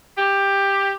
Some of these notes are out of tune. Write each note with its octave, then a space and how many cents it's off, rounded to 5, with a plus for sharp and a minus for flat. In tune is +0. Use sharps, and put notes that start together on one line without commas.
G4 +10